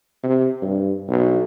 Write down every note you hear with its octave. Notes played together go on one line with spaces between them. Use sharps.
C3
G2
B1